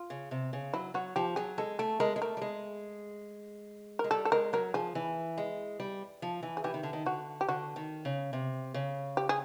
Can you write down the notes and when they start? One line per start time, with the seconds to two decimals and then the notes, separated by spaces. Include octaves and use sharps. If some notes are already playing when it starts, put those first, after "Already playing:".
Already playing: F4
0.10 C#3
0.31 C3
0.53 C#3
0.74 F#3 E4
0.94 F#3 F#4
1.16 F3 G4
1.36 F#3 G#4
1.58 G#3 A4
1.79 A3 A4
2.00 G#3 A#4
2.16 G#3
2.22 A3 A#4
2.37 G3
2.42 G#3
3.99 G#3 A#4
4.11 G3 A4
4.25 A4
4.32 G#3 A#4
4.53 F#3 A#4
4.74 F3 G#4
4.95 E3
5.38 G#3
5.80 G3
6.22 F3
6.43 E3
6.57 G#4
6.64 E3 G4
6.74 D#3
6.83 D3
6.93 D#3
7.06 D3 F#4
7.41 G4
7.48 D3 F#4
7.76 D#3
8.05 C#3
8.33 C3
8.74 C#3
9.17 G4
9.29 G#4